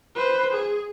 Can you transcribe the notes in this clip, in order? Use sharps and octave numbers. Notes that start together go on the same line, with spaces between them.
B4 C5
G#4